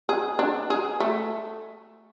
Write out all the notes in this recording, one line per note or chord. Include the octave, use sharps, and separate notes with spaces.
G#4
D4
G#4
A3